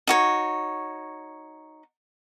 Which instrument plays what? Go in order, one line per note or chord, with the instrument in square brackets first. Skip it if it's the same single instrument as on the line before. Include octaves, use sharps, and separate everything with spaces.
[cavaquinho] D#4 F#4 C#5